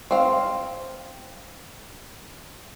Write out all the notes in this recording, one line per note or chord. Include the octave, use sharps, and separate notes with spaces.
C4 F5